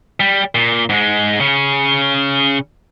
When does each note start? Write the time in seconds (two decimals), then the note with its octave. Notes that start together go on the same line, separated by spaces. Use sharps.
0.20 G3
0.55 A#2
0.89 G#2 G#3
1.40 C#3 C#4